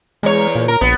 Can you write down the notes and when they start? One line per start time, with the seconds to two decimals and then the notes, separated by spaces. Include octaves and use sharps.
0.23 E2 G#3 C#5
0.55 A#2
0.68 A#4
0.81 A#1 B3